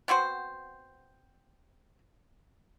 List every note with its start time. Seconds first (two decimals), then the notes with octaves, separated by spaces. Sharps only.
0.08 B3 C4 F#4 C5